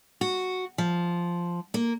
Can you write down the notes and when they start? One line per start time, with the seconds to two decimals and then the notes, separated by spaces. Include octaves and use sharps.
0.21 F#4
0.78 F3
1.74 A#3